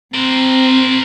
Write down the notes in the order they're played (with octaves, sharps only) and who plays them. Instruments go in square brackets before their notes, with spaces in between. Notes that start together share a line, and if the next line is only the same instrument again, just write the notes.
[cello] C4 [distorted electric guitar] A#4 C5